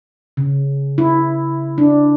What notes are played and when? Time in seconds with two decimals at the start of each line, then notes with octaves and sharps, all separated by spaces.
0.37 C#3
0.98 E4
1.78 D4